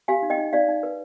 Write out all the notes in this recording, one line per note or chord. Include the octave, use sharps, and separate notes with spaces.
G4 F5 G#5
D#4
D#5 G5
D#4
D#4 D5 F5
D#4
B4